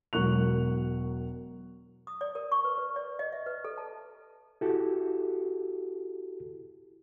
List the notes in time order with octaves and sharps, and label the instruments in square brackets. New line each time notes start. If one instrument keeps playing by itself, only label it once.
[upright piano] E1 F#3 A#4 C#6 F#6 F7
[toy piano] D#6
D5
A#4
C#6
B4
B4
D5
D#5
E5
B4
A4
A5
[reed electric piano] E4 F#4 G4 A4